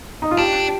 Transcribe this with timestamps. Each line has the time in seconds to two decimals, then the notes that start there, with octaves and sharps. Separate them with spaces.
0.22 D#4
0.31 F4
0.38 D4 G4